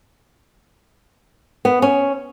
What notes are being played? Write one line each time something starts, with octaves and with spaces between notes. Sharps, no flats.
B3
C#4